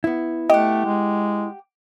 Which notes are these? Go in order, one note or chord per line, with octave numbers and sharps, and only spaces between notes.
B3 E4
A3 G4 D#5 F#5
G#3